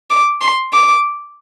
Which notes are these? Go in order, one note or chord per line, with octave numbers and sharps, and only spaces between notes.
D6
C6
D6